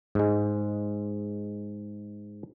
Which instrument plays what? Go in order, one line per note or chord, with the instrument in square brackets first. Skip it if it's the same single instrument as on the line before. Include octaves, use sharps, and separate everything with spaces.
[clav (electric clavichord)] G#2 G#3